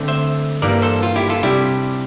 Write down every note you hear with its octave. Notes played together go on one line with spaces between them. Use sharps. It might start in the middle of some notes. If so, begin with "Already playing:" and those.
Already playing: D3 A3 C4
C5 E5
G2 E3 G3 A#3 A#4 D5
A4 C5
F4
E4 G4
F4 A4
C3 G3 D4 E4 G4